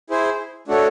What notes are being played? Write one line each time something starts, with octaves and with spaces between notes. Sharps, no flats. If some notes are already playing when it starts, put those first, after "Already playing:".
E4 G#4 C5
A3 D4 F#4 A4 C#5